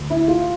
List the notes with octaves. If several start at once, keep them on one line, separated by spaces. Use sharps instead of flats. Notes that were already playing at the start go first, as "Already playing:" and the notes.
Already playing: D2
E4
F4